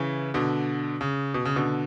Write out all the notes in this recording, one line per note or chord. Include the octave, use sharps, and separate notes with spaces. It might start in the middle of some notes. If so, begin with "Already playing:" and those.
Already playing: C#3 E3
B2 D3
C#3
B2
C#3
B2 D3